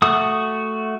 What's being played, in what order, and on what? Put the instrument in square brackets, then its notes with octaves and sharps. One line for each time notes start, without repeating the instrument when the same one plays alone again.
[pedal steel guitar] A3 F#4 D#6